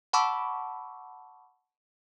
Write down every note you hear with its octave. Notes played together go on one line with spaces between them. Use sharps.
F#5 A5 B5 C#6 D6 E6